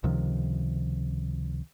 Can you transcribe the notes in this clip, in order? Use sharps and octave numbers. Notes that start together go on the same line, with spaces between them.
C#2 C3 D#3 F3